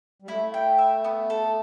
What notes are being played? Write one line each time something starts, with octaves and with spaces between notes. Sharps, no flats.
G3
A3 E4
G5
E5
B3
A4